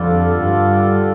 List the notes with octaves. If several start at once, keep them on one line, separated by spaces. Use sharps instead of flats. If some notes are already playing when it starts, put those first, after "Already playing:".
Already playing: F2 D3 G3 D4 F4 A4
G2